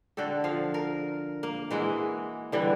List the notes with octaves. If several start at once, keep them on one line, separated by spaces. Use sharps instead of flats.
D3 F#4 G4 A4
F3 F5
A#4
A#3
E3 G#3 E4 F#4
D3 E3 G3